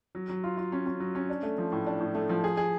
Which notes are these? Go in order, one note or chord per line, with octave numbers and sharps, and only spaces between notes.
F#3
F#3
F4
F4
C#4
C#4
F#3
C#4
D4
A3
F3
A2
D4
A2
A3
F3
G#4
G#4